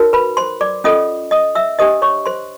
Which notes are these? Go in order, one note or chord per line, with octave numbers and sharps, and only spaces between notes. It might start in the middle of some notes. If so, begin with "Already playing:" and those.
Already playing: D#4 F#4 A#4 C#5
B4 B5
C5 C6
D5 D6
C#4 F4 A4 D#5 D#6
D#5 D#6
E5 E6
D4 G4 C5 D#5 D#6
C#5 C#6
C5 C6